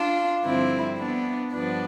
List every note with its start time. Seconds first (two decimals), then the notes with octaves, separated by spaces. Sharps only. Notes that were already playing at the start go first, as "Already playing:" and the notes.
Already playing: D4 F4
0.44 G2 D3 F3 C4 E4
0.98 B3 D4
1.52 G2 F3 B3 D4